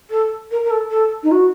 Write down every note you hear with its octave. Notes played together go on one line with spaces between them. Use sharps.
A4
A#4
A#4
A4
A4
D#4
F#4